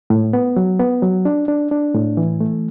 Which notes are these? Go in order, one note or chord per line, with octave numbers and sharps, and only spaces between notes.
A2
B3
F#3
B3
F#3
D4
D4
D4
A2
E3
A3